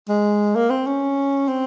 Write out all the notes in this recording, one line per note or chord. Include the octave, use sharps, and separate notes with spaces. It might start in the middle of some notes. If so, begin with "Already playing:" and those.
G#3
A#3
C4
C#4
C4